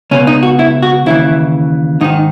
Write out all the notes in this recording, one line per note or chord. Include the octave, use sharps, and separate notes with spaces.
C#2 B2 C#4
D#4
F#4
E4
F#4
D#2 C#3 E3 E4
G#2 D#3 D#4